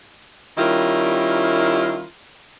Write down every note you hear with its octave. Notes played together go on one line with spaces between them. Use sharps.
D#3 G3 C#4 E4 F4 A#4